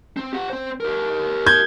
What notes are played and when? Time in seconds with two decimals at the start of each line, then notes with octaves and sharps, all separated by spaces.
0.17 C4
0.33 G4 F#5
0.50 C4 C5
0.80 G4 A#4
1.46 G6 G#6